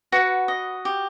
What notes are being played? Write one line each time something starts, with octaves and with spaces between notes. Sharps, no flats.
F#4 B4 F#5
D#5
G4